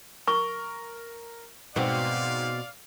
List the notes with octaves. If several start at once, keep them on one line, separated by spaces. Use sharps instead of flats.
A#4 C#6
G#2 B2 B3 C4 D5 F5